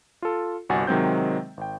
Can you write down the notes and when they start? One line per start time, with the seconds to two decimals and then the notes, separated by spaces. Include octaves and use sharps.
0.22 F4 A4
0.69 G1 C2 F#4 F#5 G#5 A6
0.87 C3 D#3 F#3 G#3 C4 G6
1.57 G#1 G5